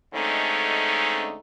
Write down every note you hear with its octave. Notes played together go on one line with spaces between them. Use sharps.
D3 G#3 A3 C4 C#4 D#4